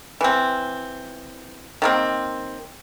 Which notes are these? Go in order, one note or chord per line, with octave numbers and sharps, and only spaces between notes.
E3 C4
D#3 A#3 C4